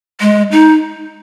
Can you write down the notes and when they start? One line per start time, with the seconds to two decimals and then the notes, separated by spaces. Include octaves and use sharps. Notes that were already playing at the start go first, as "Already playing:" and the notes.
0.21 G#3
0.52 D#4